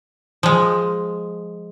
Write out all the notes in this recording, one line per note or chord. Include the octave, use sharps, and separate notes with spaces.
F3 G#3